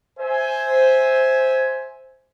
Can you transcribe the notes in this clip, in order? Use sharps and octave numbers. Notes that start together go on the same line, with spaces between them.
C5 E5 G#5